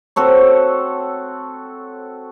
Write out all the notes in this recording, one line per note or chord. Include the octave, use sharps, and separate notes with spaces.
C4 F#4 A4 C#5